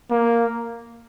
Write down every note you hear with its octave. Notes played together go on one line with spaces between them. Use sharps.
A#3